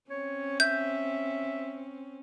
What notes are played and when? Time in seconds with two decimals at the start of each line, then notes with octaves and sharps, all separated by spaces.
0.11 C4 C#4 C#5
0.60 E5 G6